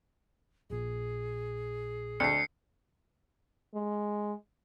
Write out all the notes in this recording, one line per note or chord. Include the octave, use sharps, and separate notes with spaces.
A#1 A#2 G#4
D2 C7 C#7
G#3